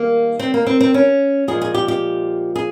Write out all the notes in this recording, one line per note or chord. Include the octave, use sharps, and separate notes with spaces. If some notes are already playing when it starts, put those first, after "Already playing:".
Already playing: D#3 G3 A#3
C4
A#3
C4
C4
C#4
A#2 F3 G#3 G#4
G#4
G4
G4
G#4